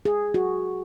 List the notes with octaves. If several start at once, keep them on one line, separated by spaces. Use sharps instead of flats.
G#4
F#4